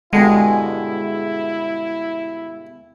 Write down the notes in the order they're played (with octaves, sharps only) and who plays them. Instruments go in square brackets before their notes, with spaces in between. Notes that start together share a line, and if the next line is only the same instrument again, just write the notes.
[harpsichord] G2 B2 D3 [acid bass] G#3 [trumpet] E4